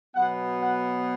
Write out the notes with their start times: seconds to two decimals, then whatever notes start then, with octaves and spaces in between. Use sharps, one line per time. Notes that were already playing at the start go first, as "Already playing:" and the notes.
0.15 B2 F#3 B3 F#5
0.61 F#5